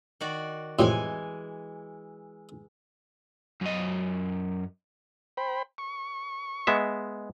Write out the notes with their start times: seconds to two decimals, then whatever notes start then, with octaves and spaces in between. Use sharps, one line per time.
0.21 D#3 F#4 D5
0.79 F2 A2 C3 E3 G#3 G#5
3.61 F#2 D#5
5.37 C5 G5 B5
5.78 C#6
6.67 G#3 B3 E5